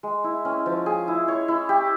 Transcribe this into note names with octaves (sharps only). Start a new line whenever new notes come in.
G#3
E4
C#4
F3
G#4
E4
C#5
E4
G4